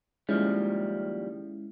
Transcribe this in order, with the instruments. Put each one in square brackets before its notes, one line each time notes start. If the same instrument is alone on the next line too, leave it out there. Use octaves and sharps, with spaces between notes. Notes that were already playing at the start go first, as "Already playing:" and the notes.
[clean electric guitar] D#2 F3 G3 [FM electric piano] G#3 C#4 E4